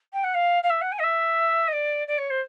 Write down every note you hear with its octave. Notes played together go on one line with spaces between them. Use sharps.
G5
F#5
F5
F5
E5
F#5
G#5
D#5
E5
D#5
D5
D5
C#5
C5